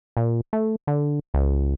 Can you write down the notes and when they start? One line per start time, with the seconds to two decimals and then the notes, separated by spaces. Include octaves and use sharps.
0.17 A#2
0.53 A3
0.87 D3
1.34 C#2